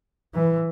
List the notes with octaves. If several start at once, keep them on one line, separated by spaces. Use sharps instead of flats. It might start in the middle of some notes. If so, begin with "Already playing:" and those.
E3